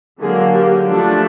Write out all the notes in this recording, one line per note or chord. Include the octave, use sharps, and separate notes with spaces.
D3 F#3 A#3 G#4
G4
F3 A3 D4